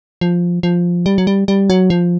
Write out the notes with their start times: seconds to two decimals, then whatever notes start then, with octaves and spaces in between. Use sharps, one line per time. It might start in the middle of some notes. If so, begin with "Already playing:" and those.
0.21 F3
0.63 F3
1.06 G3
1.18 F#3
1.27 G3
1.48 G3
1.70 F#3
1.90 F3